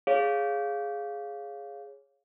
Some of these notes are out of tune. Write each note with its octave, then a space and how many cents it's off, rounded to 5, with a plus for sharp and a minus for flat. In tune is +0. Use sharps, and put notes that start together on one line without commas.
G#4 +0 C#5 +0 F5 +0